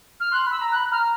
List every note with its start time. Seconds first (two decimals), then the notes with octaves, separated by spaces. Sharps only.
0.20 F6
0.31 C6 F#6
0.47 B5 E6
0.61 A#5
0.71 F#6
0.76 B5
0.91 A#5 F6